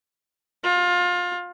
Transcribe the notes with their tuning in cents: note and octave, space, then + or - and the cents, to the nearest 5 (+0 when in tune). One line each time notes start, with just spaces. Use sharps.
F4 +25